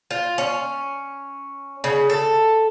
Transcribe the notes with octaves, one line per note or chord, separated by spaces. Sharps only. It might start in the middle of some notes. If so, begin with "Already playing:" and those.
F4
C#4
C#3
A4